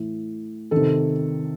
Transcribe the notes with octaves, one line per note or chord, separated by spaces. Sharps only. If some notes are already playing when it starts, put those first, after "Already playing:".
Already playing: A2 E3
C3 D#3 A4